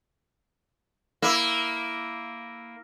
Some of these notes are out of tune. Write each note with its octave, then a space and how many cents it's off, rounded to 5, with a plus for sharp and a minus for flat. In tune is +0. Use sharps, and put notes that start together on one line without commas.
A#3 +0 E4 +0